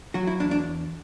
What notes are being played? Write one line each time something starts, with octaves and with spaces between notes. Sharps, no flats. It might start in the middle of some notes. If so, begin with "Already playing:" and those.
F#3 F#4
E4
E2 D4
D4